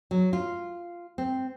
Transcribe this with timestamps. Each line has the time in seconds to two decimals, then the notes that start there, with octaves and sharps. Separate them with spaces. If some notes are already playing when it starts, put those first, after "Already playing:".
0.11 F#3
0.33 F4
1.18 C4